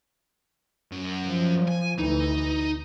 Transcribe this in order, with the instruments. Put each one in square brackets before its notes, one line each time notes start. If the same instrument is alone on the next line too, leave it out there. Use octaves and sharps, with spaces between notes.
[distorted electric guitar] F#2
[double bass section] F3
[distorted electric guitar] G#5
[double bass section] D2 E3 [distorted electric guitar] D#4